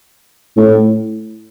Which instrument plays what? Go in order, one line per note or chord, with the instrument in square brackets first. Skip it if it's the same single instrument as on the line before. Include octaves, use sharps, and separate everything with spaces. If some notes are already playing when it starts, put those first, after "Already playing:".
[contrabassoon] A2